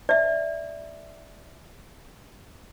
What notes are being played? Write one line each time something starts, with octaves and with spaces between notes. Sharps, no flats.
D5 E5